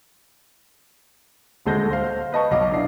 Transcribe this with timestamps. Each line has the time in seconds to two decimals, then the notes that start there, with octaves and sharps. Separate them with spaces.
1.66 D#1 D2 G#3 A4 G6 A#6
1.90 C5 F5
2.32 B4 D#5 A5 C#6
2.51 B1 D#5 F5 D6
2.72 D4 E4 D5 C7